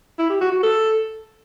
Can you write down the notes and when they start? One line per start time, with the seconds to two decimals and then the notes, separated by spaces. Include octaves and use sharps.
0.19 E4
0.30 G4
0.41 F#4
0.52 F#4
0.63 A4